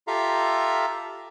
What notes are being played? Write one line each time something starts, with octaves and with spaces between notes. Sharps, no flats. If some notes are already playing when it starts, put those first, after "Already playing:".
F4 G4 A4 E5 F5 A#5